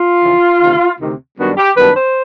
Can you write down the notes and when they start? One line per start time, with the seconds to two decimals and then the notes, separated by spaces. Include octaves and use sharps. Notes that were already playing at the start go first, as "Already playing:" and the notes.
Already playing: F4
0.22 F2 C#3 E3
0.61 D2 C3 D#3
1.00 D2 C3 D#3
1.39 F#2 D#3 G3 B3 D4 F#4
1.57 G4
1.77 F#2 D#3 G3 B3 D4 B4
1.96 C5